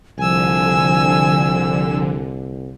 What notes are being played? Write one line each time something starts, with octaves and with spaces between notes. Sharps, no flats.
C2 D3 F3 G#5 E6